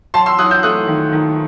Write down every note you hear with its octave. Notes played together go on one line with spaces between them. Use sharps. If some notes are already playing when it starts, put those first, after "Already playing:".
F#3 A5 C6
C6 E6
F#3 D#6 F#6
E6 G6
A3 D#6 F#6
D#3
D#3